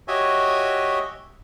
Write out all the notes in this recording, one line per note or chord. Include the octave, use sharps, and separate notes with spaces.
F#4 G4 C#5 D#5 E5 G#5